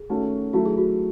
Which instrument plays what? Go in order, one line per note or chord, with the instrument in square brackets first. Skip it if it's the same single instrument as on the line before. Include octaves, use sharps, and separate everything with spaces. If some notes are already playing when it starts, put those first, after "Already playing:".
Already playing: [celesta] G#4
[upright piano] D#3 A3 C#4 F#4
[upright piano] D#3 F#3 A3 E4 [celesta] F#4
[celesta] G#4
F#4